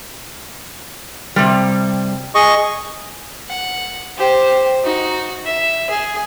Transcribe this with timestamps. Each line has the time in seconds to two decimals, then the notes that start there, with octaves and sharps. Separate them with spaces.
1.36 C3 G3
2.35 G#4 D#5 C#6
3.48 F#5
4.17 G4 C5
4.84 D#4 F#4
5.45 E5
5.90 G#4